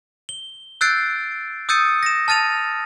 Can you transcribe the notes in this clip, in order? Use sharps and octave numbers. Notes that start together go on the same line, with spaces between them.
G7
E6 F#6 G6 A6 C7 D7
D#6 E6 G6 A6 C#7 D#7
A#6 E7
A5 F6 A6 D#7 F7